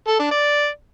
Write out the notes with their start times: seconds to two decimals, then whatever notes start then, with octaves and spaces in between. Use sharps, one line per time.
0.07 A4
0.19 D4
0.31 D5